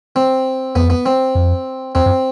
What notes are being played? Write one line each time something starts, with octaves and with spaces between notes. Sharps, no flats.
C4
F2 B3
B3
C4
F2
E2 C4
F#2